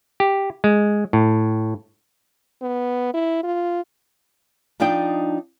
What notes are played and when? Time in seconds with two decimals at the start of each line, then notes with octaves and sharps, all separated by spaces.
0.20 G4
0.64 G#3
1.13 A2
2.62 B3
3.14 E4
3.43 F4
4.80 F3 D4 D#4 D#5 G5